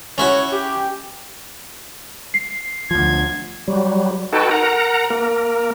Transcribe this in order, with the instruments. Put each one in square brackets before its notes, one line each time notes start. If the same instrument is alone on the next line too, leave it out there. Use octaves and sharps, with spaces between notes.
[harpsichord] C#4 E4 F#4 [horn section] C#5
[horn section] G4
[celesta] C7
[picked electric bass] D2 F3 [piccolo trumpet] G#6
[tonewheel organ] F#3 G3
D#4 F#4 A4 B4 G5 A5
A#4 F#5 A#5
A#3 A#4